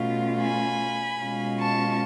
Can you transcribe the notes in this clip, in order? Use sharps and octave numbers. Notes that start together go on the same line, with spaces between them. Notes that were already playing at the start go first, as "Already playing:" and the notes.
Already playing: B2 A3 C#4 F4
G#5 B5
B2 G#3 C#4 F4
A5 C#6